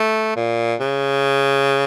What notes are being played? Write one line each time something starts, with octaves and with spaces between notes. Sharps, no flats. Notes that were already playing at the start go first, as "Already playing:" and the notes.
Already playing: A3
A#2
C#3